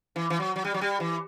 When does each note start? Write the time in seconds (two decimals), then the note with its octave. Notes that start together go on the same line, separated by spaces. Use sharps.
0.16 E3
0.30 E3
0.40 F#3
0.56 F#3
0.65 G3
0.74 F#3
0.81 G3
1.00 E3